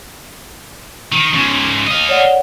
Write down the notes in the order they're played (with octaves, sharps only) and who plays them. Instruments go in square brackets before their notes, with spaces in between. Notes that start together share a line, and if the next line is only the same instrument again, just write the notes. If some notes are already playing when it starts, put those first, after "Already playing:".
[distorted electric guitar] D#3
G#2 C#3
D#5 F5
[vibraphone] C#5 D5 F#5